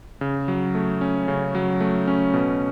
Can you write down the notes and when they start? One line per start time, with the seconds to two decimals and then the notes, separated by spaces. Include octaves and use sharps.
0.21 C#3
0.48 F#3
0.75 A3
1.01 C#4
1.28 C#3
1.55 F#3
1.80 A3
2.08 C#4
2.34 B2